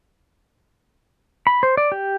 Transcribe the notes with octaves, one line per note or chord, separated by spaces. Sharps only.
B5
C5
D5
G4